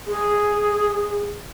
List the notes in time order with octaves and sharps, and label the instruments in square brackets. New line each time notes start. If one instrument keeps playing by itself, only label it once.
[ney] G#4